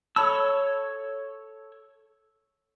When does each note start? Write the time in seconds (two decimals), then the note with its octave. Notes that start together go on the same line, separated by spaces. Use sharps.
0.16 A4 C#5 A5 B5 E6